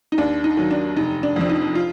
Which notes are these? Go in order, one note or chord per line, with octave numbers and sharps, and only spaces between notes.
D#4
D#2 D4
D#4
D#3 F#3
D4
F1 D#4
D4
F2 F3 D4
D#4
F4